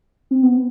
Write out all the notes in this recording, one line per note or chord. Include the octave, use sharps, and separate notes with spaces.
C4
B3